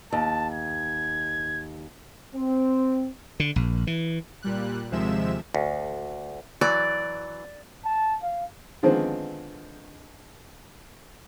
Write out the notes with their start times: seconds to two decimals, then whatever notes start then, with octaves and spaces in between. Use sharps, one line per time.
0.13 D#2 A5
0.53 G#6
2.35 C4
3.40 D3
3.56 A#1
3.87 E3
4.42 A#2 G3 F#6
4.91 D#2 C3 F3 G#3 E5 E7
5.55 D2
6.61 E3 F#3 D5
7.85 A5
8.23 F5
8.83 D3 D#3 F3 G#3 B3 C4